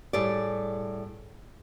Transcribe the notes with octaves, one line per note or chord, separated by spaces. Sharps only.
A2 G3 A3 G#4 C#5 D5